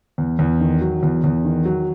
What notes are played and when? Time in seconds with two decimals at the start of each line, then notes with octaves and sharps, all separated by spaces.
0.18 E2
0.39 E2
0.60 D#3
0.81 F#3
1.03 E2
1.24 E2
1.45 D#3
1.65 F#3